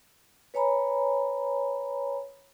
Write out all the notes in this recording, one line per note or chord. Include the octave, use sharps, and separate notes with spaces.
B4 C#5 G#5 A#5 B5